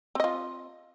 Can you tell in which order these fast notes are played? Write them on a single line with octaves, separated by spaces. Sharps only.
C4 D#5 F4